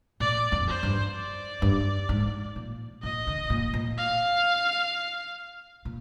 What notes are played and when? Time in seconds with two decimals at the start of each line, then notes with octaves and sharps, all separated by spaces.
0.20 A#2 D5
0.52 F2
0.68 C5
0.83 G2
1.15 D5
1.62 G2
2.09 G#2
2.56 A#2
3.03 A#2 D#5
3.27 D3
3.50 A#2
3.74 A#2
3.97 F5
5.85 A#2